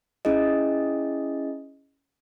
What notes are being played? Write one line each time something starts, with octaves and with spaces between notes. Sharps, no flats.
C#4 E4 G#4 D#5